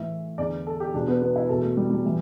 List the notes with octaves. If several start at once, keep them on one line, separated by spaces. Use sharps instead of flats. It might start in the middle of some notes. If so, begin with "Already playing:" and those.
Already playing: A2 E3 E5
E2 D3 D5
A4
G4
E2 B2 D4
B3
B3
E4
E2 B2 A4
A3
G3
G3
A2 E3